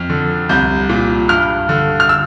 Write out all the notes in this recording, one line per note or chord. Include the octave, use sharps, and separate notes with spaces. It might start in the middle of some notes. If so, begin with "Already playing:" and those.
Already playing: F2 F6
D3
C2 G6
A#2
G2 F6
D3
F6
E6